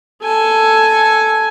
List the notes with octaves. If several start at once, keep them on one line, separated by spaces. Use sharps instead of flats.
A4 G#5